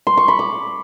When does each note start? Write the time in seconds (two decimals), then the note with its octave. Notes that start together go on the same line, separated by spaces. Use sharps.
0.07 C6
0.17 C#6
0.28 B5
0.39 D6